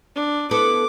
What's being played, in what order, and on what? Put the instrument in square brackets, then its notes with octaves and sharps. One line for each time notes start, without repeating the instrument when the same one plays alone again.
[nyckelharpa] D4
[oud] B3 E4 A4 [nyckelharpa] D6